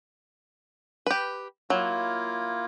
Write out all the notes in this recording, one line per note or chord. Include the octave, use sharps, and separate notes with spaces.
G4 B4
F#3 A#3 E4 F4